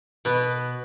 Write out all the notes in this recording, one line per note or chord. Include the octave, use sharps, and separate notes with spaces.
B2 B4